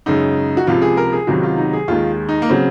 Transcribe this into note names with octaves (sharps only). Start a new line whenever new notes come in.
F#2 C#3 G#3 D#4
F#4
C#2 C3 F3 F4
G#4
A#4
G#4
C#2 C3 D#3 F#3 F#4
F4
D#4
G#4
D#2 D#3 G#3 F4
D#4
A#3
C#3 F#3 C4